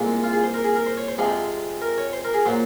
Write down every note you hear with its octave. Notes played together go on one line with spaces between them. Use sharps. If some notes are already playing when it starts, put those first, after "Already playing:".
Already playing: C2 A#2 G#3
F4
G#4
C5
A#4
G#4
A#4
C5
C#5
C5
F2 C3 F3 G#3 G#4
A#4
C#5
C5
A#4
G#4
A#2 F#3 C5